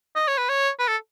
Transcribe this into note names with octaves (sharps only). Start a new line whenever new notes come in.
D#5
C#5
B4
C#5
B4
A4